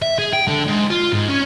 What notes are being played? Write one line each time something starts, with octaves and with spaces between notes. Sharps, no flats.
E5
G#4
G5
D3
G#2
F4
G#2
C#4